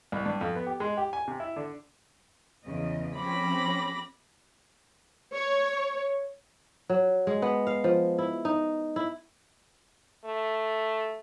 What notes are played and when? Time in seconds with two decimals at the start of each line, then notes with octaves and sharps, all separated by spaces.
0.12 C2
0.26 G2
0.41 F2
0.55 B3
0.67 G4
0.80 G#3
0.97 G4
1.13 G#5
1.28 C3
1.40 E4
1.56 D3
2.65 E2 C#3 D#5
3.16 F3 C4 C#4 B5 D6 A#6
5.34 C#5
6.89 F#3
7.27 G#3
7.42 B3
7.67 F5
7.84 F3
8.18 E4
8.45 D#4
8.96 E4
10.25 A3